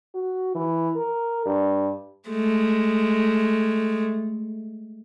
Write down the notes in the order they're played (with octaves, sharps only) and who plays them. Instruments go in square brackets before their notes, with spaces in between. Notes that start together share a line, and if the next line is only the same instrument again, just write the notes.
[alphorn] F#4
E3
A#4
G2
[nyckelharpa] G#3 A3